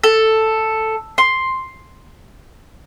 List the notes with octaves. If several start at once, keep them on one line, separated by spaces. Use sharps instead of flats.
A4
C6